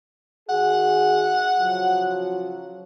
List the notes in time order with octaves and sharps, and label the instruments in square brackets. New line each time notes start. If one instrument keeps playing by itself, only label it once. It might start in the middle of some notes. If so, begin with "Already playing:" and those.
[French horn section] D#3 F#4 G#4 [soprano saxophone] F#5
[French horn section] C#3 F3 F#3